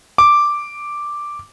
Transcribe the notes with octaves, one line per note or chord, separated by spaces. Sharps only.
D6